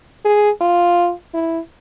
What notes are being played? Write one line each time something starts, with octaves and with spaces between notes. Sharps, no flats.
G#4
F4
E4